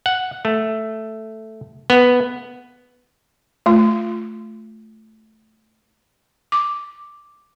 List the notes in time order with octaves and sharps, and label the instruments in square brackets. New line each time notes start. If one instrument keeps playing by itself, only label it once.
[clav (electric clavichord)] F#5
A3
B3
[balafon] A3 F4
D6